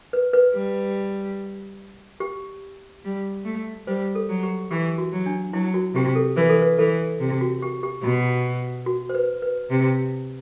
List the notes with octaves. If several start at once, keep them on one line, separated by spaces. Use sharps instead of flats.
B4
B4
G3
G4
G3
A3
G3 C5
A4
F#3
G4
E3 G4
F#4
F#3
D4
F#3 E4
F#4
C3 G4
A4
E3 B4
A4
B4
E3 A4
C3
F#4
G4
G4
B2 F#4
F#4
C5
B4
B4
C3